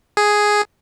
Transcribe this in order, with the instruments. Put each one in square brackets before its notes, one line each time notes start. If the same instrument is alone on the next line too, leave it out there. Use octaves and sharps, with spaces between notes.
[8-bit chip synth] G#4